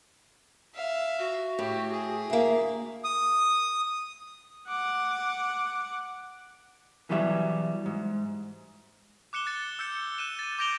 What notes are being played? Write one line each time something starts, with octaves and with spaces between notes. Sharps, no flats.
E5 F5
F#4
A2 G4
G#4
D2 A#3 E5
D#6
F#5 D6
B2 E3 F#3 G3 B4 E5
G#2
D6 F#6 C#7 E7 G7
F#6 A6 C#7
E6 G6 C#7 G7
F#6 D#7 E7
A6 D#7
D6 G6 A#6 D7 F7 G7